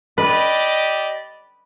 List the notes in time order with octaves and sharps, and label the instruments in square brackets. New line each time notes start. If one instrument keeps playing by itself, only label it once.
[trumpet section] G4 D5 D#5 [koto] B4